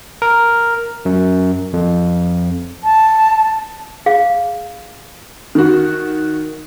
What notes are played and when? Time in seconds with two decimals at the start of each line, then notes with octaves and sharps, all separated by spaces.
0.22 A#4
1.05 F#2
1.73 F2
2.84 A5
4.06 G#4 F5
5.55 D#3 F#4